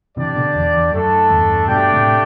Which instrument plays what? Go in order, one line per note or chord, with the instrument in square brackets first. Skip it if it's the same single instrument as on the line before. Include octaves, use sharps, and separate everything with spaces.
[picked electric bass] C3 E3 [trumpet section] D4 G4 D5
[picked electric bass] B2 D3
E2
E2
[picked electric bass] F#2 [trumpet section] A3 D4 A4
[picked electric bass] E2 G2
[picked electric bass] G2 B2 [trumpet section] A3 D4 G4 D5 G5
[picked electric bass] A2 C3